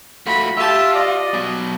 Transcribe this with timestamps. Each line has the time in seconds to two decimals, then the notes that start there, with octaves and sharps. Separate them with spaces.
0.27 A3 F4 F#4 B5
0.57 F4 G4 E5 A5
0.95 D5 D#5
1.34 B2 F#3